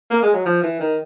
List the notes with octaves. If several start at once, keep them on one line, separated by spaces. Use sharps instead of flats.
A#3
G#3
F#3
F3
E3
D#3